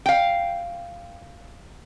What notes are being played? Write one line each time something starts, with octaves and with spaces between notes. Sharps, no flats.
F5 G5